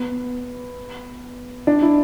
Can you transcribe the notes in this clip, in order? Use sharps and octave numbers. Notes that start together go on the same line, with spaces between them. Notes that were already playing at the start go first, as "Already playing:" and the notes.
Already playing: B3
D4
E4